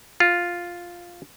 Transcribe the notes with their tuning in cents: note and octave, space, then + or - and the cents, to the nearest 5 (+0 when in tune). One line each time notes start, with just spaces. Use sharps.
F4 +0